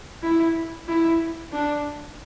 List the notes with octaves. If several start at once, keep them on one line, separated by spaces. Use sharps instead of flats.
E4
E4
D4